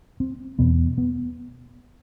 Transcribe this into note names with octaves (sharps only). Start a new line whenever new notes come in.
C4
E2 B2 B3
B3